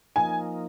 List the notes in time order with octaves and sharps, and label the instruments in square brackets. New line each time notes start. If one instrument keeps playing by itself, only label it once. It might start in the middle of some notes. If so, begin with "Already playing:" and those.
[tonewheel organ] F3 A#3 D#4 [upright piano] G#5